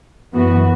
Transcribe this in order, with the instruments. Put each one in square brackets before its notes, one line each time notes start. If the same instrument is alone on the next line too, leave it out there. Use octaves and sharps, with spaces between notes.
[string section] F#2 E3 B3 F#4